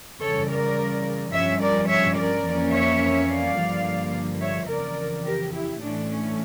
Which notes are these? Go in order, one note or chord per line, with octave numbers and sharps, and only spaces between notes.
C#3 E3 G3 A4 C#5
A#4 D5
G2 F3 C#4 C#5 E5
A#4 D5
C#5 E5
A#4 D5
F2 E3 A#3 C#4
C#5 E5
D5 F5
G2 D3 F3 A#3
C#5 E5
F2 C#3 E3 A#4 D5
G4 A#4
E4 G4
A2 E3 A3 C#4 D4
C#4